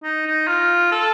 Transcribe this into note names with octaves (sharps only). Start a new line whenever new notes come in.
D#4
D#4
F4
A4